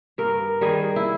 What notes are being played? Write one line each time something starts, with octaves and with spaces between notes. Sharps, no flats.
G2 A#4
D#3 G3 G#4
E4